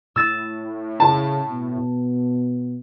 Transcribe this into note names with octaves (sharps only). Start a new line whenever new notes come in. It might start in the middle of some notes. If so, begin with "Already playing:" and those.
A2 E6 A6
C#3 A5
B2